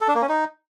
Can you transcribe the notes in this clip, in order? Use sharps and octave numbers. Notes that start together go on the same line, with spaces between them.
A4
D4
A#3
C#4
D#4